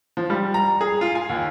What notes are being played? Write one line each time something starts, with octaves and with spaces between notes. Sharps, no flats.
F3
G3
A#5
G#4
F4
G#5
D#2